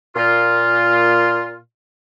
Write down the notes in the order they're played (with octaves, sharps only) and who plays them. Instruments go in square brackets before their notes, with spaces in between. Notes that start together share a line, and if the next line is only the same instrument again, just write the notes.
[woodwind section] A#2 F4